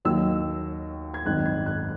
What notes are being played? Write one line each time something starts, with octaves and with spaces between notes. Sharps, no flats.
D#2 D#3 F#3 E6
G#6
G#1 F#2 D#3 F#6
G#6
F#6